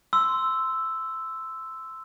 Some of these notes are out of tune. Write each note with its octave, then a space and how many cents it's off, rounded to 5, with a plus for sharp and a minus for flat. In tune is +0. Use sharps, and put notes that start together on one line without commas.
C6 -10 E6 +0